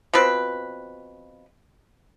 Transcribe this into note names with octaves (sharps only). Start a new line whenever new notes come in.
B2 F3 C4 B4